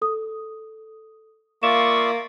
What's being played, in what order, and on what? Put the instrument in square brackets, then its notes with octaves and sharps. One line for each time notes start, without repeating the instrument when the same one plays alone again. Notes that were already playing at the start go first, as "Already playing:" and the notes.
[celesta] A4 D#6
[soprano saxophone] A#3 [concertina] F4 D5 E5 [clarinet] C#6 [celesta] E7